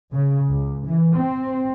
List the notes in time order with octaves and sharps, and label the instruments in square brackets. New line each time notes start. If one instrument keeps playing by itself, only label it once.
[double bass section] C#3
C#2
E3
C4